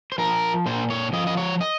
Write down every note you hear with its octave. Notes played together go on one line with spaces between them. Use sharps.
C5
F3 A#4
A#2 C5
C#5
F3 D#5
D#5
C#5
D#5